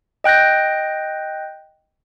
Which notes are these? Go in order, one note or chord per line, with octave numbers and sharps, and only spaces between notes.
D#5 G5 F#6 G6 A#6